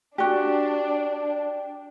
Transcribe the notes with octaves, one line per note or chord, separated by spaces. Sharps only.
D4 F#4 G4 D5 G5